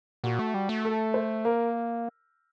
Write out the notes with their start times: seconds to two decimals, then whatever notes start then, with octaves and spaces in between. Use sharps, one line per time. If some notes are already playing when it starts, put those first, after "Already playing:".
0.24 A#2 F#4
0.39 A3
0.54 G3
0.69 A3
0.85 A4
1.14 C5
1.45 A#3 A#4